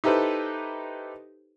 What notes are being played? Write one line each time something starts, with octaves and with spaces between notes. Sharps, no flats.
D#4 E4 G4 A4 B4 C5